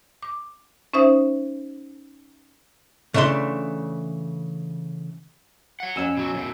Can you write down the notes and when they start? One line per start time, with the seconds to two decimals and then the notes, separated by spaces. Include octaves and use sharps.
0.22 D6
0.94 C#4 D#4 C5 E5 D#6
3.14 C#3 E3 A3 D4 C6
5.80 C#5 F#5
5.96 F2 C#4 G#5 E6
6.17 B2 F#3
6.34 F#2 B2